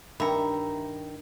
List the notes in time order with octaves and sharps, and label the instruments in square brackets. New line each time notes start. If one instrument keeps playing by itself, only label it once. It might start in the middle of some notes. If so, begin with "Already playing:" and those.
[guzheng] G2 [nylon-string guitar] D#3 [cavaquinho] E5 A#5 [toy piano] G5 B5